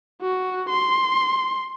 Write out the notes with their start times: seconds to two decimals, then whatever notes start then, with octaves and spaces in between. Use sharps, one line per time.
0.21 F#4
0.70 C6